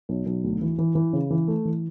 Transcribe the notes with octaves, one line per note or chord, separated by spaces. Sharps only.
B1
B1
D2
E3
E3
E3
C#3
E3
A3
E3